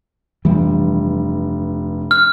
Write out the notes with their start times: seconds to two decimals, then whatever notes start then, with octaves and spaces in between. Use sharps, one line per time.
0.45 F1 G2 E3 G3
2.11 F6